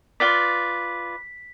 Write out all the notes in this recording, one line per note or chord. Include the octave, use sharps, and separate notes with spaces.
F4 B4 D5 B6